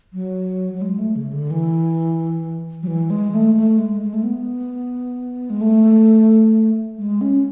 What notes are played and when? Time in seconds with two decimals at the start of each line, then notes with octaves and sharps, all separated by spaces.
0.13 F#3
0.74 F#3
0.82 G#3
0.99 A3
1.16 C#3
1.33 D3
1.51 E3
2.83 F#3
2.87 E3
3.10 G#3
3.33 A3
3.55 A3
3.78 G#3
4.01 G#3
4.14 A3
4.24 B3
5.50 G#3
5.61 A3
6.98 G#3
7.21 C#4